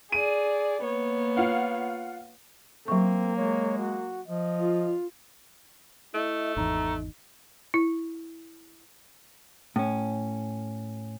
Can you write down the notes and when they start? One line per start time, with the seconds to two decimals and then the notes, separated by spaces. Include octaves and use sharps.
0.12 G#4 D5 D#7
0.82 A#3 B3 C#5
1.37 F4 F5 F#5
2.88 F#3 A#3 C4 C#6
3.37 G#3 C#5
3.78 F#4
4.28 F3 D#5
4.60 F4
6.14 A3 E4 D#5
6.57 G#1 E2 D#4 A#5
7.74 E4
9.76 A2 C#4